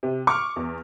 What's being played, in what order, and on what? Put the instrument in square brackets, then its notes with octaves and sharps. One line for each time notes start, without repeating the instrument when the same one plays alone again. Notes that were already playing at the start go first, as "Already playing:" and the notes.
[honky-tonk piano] C3
[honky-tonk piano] C#6 [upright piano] D6 F6
[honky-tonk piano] E2